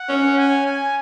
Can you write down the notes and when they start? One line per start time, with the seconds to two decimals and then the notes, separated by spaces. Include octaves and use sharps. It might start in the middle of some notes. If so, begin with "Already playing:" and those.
Already playing: F#5
0.09 C#4
0.38 G#5
0.66 G#5